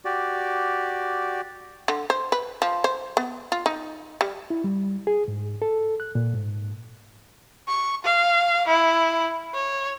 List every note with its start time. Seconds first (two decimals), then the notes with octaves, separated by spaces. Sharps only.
0.05 F#4 G4 D5
1.88 D3
2.10 C5
2.32 B4
2.62 F3
2.84 C5
3.17 B3
3.52 F4
3.66 D#4
4.21 G3
4.50 E4
4.64 G3
5.07 G#4
5.28 G#2
5.62 A4
6.00 F#6
6.15 A#2
6.34 G#2
7.68 C#6
8.04 F5
8.67 E4
9.54 C#5